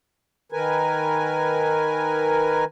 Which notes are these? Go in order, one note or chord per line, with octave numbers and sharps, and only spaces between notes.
D#3 A#4 B4 G#5